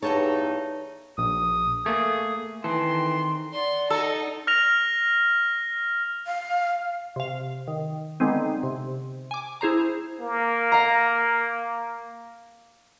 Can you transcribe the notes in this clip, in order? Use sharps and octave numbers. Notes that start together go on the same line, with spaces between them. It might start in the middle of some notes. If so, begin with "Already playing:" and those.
E2 G2 D#4 A4 C#5 A5 A#5
A#1 D#6
A3 A#3 G#4
D#3 E3 C4 A4 C6
D5 F#5 C6
D#4 A4 E6
F6 A#6 F7
F5
C3 F5
D#3
D3 G#3 B3 C4 D#4
C3
G#5 D6
E4 G#4 C5 A#5
A#3
F5 A#5